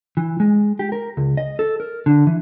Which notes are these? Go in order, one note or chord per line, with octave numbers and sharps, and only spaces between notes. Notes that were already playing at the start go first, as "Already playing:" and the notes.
E3
G#3
G4
A#4
C#2
D#5
A4
A#4
D3
E3